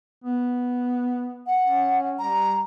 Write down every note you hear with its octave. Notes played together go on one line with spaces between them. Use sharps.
B3
F#5
C#4
G3 A#5